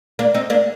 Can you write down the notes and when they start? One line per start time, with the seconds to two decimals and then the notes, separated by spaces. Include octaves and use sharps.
0.19 A#3 D4
0.34 C4 D#4
0.50 A#3 D4